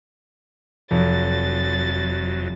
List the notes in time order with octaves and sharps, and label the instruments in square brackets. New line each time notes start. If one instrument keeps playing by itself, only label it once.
[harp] F1 [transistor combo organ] F2 F#3 [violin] A6